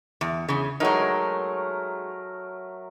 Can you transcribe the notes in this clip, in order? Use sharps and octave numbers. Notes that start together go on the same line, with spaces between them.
E2
E2 C#3
F#3 G#3 A3 D#4 A#4